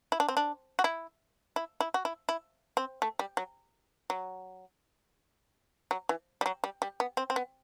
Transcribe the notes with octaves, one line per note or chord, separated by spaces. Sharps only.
E4
D4
C4
D4
F#4
E4
E4
E4
F#4
E4
E4
C4
A3
G3
F#3
F#3
F#3
E3
G3
F#3
G3
G3
B3
C4
C4
B3